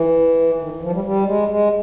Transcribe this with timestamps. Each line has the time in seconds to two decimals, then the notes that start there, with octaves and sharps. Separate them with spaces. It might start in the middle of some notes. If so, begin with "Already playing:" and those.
Already playing: E3
0.59 D#3
0.81 F3
0.93 G3
1.04 G3
1.26 G#3
1.48 G#3